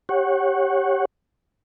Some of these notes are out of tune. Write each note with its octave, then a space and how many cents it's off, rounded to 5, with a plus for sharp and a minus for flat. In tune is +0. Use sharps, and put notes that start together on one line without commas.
G4 +0 C#5 -20 F#5 +0